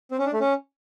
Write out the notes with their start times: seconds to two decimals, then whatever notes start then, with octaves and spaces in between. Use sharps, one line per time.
0.11 C4
0.19 C#4
0.26 D4
0.33 A3
0.41 C#4